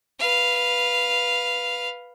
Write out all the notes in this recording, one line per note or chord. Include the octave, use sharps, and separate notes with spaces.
B4 F5